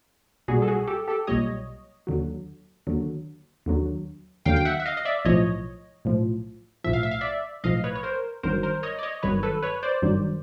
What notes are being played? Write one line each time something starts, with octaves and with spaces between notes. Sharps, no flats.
B1 A#2 G3 F#4 G#4
A4
F#4 G#4
G4 A4
G4 A4
B1 A#2 G3 C#5 D#5
D#2 D3 F#3
D#2 D3 F#3
D#2 D3 F#3
D#2 D3 F#3 F5 G5
G5
E5 F#5
E5
D#5 F5
D#5
D5 E5
B1 A2 F3 C#5 D#5
B1 A2 F3
B1 A2 F3 E5
F5
E5
F5
D5 E5
B1 A2 F3 D#5 F5
B4 C#5
C#5
A#4 C5
G1 G2 D#3 F#3 A#4 C5
A#4 C5
C#5 D#5
D5
C#5 D#5
G1 G2 D#3 F#3 B4 C#5
A4 B4
B4 C#5
C5 D5
G1 G2 D#3 F#3